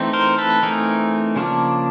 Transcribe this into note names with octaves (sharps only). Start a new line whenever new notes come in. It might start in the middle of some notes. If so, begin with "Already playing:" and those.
Already playing: E3 A3 C4 D#4
A#4 C5
A4 B4
E3 A3 C4 D#4 G#4 A#4
C#3 F3 A#3 D4